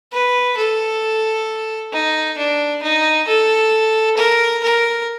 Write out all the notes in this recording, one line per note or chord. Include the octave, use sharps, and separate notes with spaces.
B4
A4
D#4
D4
D#4
A4
A#4
A#4